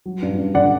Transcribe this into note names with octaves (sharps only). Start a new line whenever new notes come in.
F#3
G2
G2
D3 D5 F#5